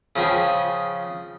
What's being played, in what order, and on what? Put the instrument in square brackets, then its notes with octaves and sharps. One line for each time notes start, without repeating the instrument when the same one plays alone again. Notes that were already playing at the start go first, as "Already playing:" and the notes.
[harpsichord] C#3 F3 G#4 G5 B5